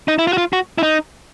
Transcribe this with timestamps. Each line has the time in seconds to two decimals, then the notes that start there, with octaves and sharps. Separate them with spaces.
0.08 D#4
0.19 E4
0.27 F4
0.33 F#4
0.38 F4
0.53 F#4
0.78 E4
0.83 D#4